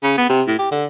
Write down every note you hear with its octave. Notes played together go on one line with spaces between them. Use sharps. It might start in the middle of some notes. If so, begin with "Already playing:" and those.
C#3
B3
C3
A2
G4
D3